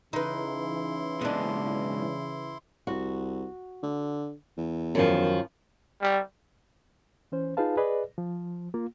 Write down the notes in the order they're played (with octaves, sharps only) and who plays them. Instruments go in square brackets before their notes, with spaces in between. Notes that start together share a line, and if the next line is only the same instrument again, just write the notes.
[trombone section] C#3 E3 [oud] D#4 B4 [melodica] E4 C6
[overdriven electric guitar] G#2 B2 [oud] G#3 D4
[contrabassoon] C2 [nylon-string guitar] F#4
[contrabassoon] D3
E2
[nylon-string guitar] F#2 D#3 F3
[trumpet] G3
[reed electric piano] E3 C#4 C5
D#4 F4 G#4 B4 F5 A5
G#4 B4 D5 D#5
F3
A#3 F4